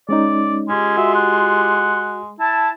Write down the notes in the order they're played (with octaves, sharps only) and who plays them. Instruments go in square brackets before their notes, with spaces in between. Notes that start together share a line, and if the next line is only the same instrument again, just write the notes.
[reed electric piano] G#3 C#4 D#4 [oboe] D5
[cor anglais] G#3 [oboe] C#4 [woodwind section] F4 G4 C6
[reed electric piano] F#4 [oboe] E5
[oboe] F#5
[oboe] E4 [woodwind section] A5